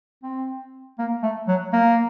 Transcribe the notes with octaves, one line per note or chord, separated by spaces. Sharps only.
C4
A#3
A3
F#3
A#3